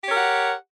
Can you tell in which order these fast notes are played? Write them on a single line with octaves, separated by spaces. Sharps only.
G4 C#5 A#4 F#5